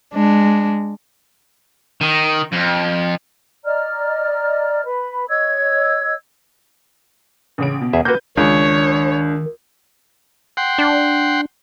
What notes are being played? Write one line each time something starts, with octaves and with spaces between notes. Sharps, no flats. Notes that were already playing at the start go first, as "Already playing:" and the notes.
G#3 D4
D#3
F2
D5 D#5 A#5 F6
B4 B5
C#5 D#5 E6 G#6
A1 C#3 D7
B2
E2 G#4 E5
A#3 F#4 B4 G6
C#2 D#3 D4 C#5
F#5 G5 C6
D4